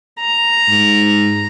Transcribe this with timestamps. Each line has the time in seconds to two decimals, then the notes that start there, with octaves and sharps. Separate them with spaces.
0.20 A#5
0.69 G#2